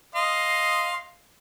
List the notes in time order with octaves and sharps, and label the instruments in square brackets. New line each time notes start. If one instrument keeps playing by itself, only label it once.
[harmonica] D#5 F5 C6